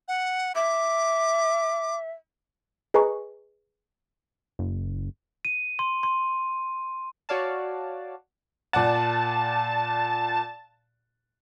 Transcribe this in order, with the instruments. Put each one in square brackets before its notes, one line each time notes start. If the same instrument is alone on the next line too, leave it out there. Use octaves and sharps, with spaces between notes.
[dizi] F#5
[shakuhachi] E5 [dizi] D6
[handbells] G#4 B4 D#5 G#5 A#5 C#6
[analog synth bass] F#1
[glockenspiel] D#7
C6
C6
[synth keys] F#4 C#5 D5 F5 A5
[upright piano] A#2 D5 F#5 [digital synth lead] A5